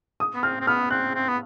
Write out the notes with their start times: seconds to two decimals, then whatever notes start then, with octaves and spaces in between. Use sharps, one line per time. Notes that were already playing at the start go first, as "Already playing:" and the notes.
0.20 D#6
0.35 B3
0.43 C4 F6
0.60 C4
0.67 B3 F6
0.90 C4 F#6
1.15 C4
1.28 B3